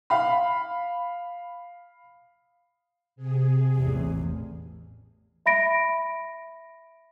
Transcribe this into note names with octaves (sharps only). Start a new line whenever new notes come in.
F5 B5
C3 G#4
A1 E2
E5 B5 A#6 D7